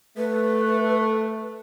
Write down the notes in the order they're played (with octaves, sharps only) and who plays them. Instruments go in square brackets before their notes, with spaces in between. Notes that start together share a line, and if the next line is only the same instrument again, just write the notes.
[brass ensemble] A3 [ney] B4